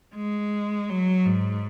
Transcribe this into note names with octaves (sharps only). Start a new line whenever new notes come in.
G#3
F#3
G#2